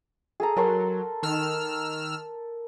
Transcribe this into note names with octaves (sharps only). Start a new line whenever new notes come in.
G#4 A4 A#5
F#3 A4 A#4 C6
D#3 E6 F6